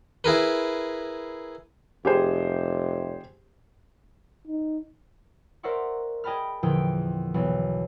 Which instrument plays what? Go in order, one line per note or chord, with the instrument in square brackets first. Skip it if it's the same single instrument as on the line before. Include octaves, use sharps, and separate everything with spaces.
[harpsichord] E4 G#4 A#4 B4
[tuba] F1 [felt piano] G4 G#4 C5
[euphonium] D#4
[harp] A#4 C5 D5 E5 F#5 C#6
G#4 D#5 G5 A5 B5 F6
E2 A#2 D3 F3 G#4 G5
B1 E3